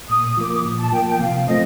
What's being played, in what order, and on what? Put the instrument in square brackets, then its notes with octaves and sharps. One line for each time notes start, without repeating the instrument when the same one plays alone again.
[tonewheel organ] A#2 [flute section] D#6
[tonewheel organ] F3 A#3 [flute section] D6
[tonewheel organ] A#2
[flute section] A5
[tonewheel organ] F3 A#3 [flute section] G5
[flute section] G5
[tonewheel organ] C3 [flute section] F5
[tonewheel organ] F3 A3 C4 [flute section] D#5